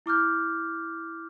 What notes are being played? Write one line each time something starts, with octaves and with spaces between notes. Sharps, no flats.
E4 D6 F6 G6